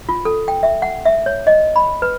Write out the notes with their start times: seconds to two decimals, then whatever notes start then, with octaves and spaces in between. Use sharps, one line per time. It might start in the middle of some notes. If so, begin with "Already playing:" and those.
0.09 F4
0.25 A4
0.48 G5
0.63 E5
0.82 F#5
1.05 E5
1.26 C#5
1.47 D#5
1.76 B5
2.02 B4